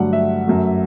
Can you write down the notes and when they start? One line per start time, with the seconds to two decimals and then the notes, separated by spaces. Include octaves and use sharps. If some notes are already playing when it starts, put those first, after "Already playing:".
Already playing: G2 D3 F#3 A3 F#5
0.13 E5
0.46 F#2 F#3 A3